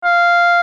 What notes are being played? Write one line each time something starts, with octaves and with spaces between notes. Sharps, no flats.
F5